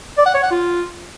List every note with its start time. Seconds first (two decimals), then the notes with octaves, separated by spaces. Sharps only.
0.18 D5
0.26 F#5
0.35 C#5
0.43 F#5
0.51 F4